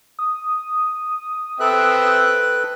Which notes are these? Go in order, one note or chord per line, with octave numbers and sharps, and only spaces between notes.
D#6
C4 A4 B4 E5 G5 F#6